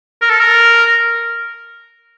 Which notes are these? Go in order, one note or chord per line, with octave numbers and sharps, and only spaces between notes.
A#4
A4
A#4